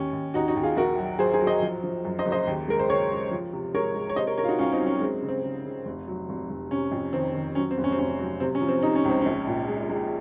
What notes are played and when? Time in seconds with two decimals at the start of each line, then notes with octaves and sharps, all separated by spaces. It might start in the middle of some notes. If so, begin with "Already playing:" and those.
Already playing: D#2 C#4
0.13 D#2
0.34 D#2 D#4 F#4
0.48 D#4 F#4
0.56 D#2
0.63 F4 G#4
0.77 A#1 F#4 A#4
0.98 F#3
1.19 F#3 G#4 C5
1.34 G#4 C5
1.41 F#3
1.47 C5 D#5
1.62 F3
1.84 F3
2.05 F#2
2.19 C5 D#5
2.25 F#1
2.32 C5 D#5
2.47 D#2
2.68 G#3 A#4
2.80 C5
2.89 C#3 A#4 C#5
3.11 G#3
3.31 F3
3.53 C3
3.74 G#3 A#4 C#5
3.95 G#3
4.09 C#5
4.16 C3 C5 D#5
4.27 A#4 C#5
4.37 C3 A#4 C#5
4.44 F4
4.48 D#4 F#4
4.59 C2 C#4 F4
4.72 C4 D#4
4.80 F#3
4.87 C#4
5.01 G#3 C4
5.22 C#3
5.28 C4
5.43 C#3
5.66 C#3
5.86 F1
6.08 F#3
6.29 F1
6.50 F1
6.71 C3 C#4
6.92 F2
7.13 D#3 C4
7.35 D#3
7.55 F#3 C#4
7.71 C4
7.77 F1
7.84 C#4
7.92 C4
7.98 F1 C#4
8.19 F#3
8.40 C3 C4
8.55 C#4
8.61 F3
8.69 C4
8.83 C3 D#4
8.95 C#4
9.05 C#2 C4
9.21 A#1 C#4
9.47 A#2
9.68 G#3
9.89 G#3